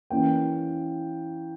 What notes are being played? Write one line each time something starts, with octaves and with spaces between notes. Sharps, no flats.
E3 A#3 C#4 G5